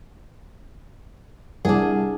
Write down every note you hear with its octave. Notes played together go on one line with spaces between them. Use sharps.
C2 D4 G#4